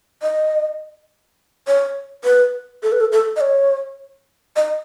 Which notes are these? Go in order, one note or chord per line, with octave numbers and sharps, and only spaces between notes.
D#5
C#5
B4
A4
B4
A4
A4
D#5
C#5
D#5